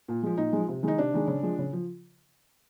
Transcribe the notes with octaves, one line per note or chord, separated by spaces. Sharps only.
A#2
F3 G#3
A#2 D#4
F3 G#3
C3
D#3 G#3 D#4
C3 D4
D#3 G#3
C#3
F3 G#3
C#3
F3